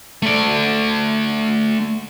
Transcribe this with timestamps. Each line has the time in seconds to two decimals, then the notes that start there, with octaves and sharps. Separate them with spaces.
0.23 A3 D5